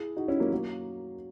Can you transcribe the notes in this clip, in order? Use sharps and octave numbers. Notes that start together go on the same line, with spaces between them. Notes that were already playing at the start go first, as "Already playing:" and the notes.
Already playing: E4 G#4
D#4 F#4
C#4 E4
F#3 A#3
F#3 A#3